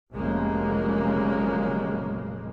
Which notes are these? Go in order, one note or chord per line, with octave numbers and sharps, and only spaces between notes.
F1 B1 A#2 C#3 G#3 A#3